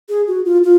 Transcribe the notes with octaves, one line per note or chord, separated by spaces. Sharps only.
G#4
F#4
F4
F4